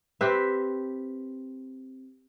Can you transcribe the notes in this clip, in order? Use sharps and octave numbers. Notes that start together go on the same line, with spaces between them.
C4 G4 B4 E5